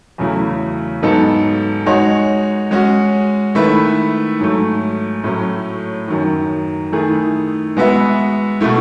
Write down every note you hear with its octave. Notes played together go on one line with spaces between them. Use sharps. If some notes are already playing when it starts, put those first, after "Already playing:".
E2 C#3 F#3 A3 E4
G#2 F#3 B3 D#4 A4
G#3 D#4 F#4 C#5
G#3 C#4 F#4
D#3 A3 E4 B4 E5
G#2 F#3 A3
A2 F#3 A3 C#4
F#2 D#3 F#3
D#3 A3 E4 G#4
G#3 B3 F#4 B4 E5
B2 A3 E4